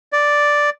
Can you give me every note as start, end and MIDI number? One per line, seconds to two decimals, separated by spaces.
0.12 0.70 74